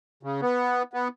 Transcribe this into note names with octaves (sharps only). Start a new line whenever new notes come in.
C#3
B3
B3